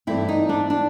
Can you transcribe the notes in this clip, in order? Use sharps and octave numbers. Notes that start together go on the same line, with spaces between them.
G2 E3 A3 C4 E4
D#4
D4
D4